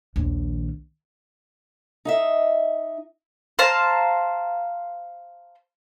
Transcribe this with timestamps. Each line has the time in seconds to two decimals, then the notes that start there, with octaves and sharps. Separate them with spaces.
0.16 A#1 D#2
2.05 D#4 D#5 E5
3.59 C5 F5 A5 A#5